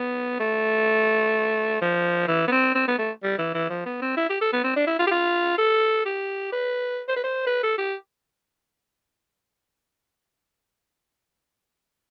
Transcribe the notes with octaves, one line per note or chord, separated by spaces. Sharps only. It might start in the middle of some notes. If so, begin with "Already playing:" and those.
Already playing: B3
A3
F3
E3
B3
C4
C4
B3
A3
G3
E3
E3
F3
B3
C4
E4
G4
A4
B3
C4
D4
E4
F4
G4
F4
A4
G4
B4
C5
B4
C5
B4
A4
G4